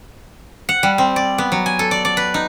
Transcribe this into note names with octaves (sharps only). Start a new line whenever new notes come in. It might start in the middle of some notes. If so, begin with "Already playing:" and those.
F#5
G3
C4
D5
B3
F#3
G#5
A4
D5
D5
B4
D#4